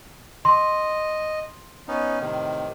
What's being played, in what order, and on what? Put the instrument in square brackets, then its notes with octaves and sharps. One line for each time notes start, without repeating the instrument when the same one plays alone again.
[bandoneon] D#5 [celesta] C6
[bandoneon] B3 C#4 D#4
A2 C3 D#3